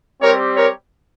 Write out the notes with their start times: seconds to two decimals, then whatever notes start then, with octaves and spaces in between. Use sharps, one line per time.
0.22 G3 C4 G4 A#4 C#5
0.57 A#4 C#5